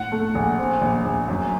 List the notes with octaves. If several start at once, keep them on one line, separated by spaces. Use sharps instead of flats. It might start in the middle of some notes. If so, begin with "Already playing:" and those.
Already playing: A2 F#5
A3
A#1
C4
A#1
A#1
F#2